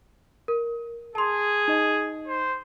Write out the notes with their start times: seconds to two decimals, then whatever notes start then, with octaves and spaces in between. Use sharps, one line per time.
0.48 A#4
1.15 G#4 A5 C6
1.68 D#4 D#5
2.28 C5